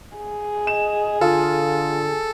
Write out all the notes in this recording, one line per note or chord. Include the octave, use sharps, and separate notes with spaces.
G#4
D#5 E7
D3 F4 A4